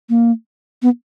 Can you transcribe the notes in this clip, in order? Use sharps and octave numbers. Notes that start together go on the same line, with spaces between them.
A#3
B3